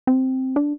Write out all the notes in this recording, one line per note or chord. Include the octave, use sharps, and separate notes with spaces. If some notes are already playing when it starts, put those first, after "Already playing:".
C4
D4